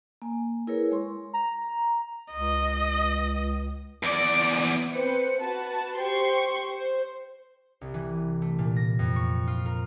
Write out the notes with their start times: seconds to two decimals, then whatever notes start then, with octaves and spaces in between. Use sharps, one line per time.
0.22 A#3 G#5
0.67 E4 G#4 A#4 B4 C#5
0.91 G#3 C6 C#6
1.33 A#5
2.32 C#2 D#5
4.03 E2 D5
4.93 C4 B4 C5 C#7
5.39 F#4 B4 A5
5.97 G4 C5 C6 C#6
6.68 C5
7.81 C2
7.94 E3
8.42 A3
8.59 A#2
8.76 A#6
8.99 F2
9.16 C#6
9.47 F4
9.66 A#4